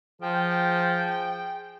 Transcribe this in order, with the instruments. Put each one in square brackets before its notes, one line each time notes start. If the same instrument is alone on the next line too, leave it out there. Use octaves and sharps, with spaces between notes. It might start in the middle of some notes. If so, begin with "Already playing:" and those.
[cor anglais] F3 [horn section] G#4 G5